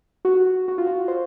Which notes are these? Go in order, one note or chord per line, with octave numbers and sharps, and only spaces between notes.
F#4
F#4
F4
F#4
C5